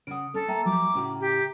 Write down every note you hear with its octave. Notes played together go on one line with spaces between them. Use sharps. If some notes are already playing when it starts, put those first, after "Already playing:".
C#3 F#5 D#6 D7
C#4 A4
A#3 E5 G5 A#5
F3 F#3 A3 D6
A2 C#3 F#4
G4